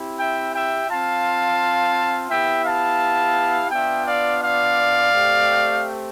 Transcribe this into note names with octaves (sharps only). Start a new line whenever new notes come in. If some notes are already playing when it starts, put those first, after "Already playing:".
Already playing: C4 E4 G4
E5 G5
E5 G5
C4 F4 F5 A5
B3 E4 G4 E5 G5
F5 A5
B3 D4 F4 E5 G5
D5 F5
D5 F5
A3 C4 G4